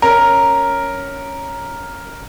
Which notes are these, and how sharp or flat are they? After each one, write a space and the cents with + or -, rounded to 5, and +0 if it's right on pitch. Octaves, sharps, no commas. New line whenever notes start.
C#4 +0 A#4 +0